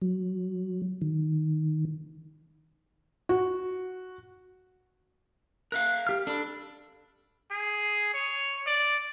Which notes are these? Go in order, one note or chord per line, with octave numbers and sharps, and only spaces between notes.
F#3
D#3
F#4
A#4 E5 F5 F#6
G4 F6
D4 A4 B5
G#4
C#5
D5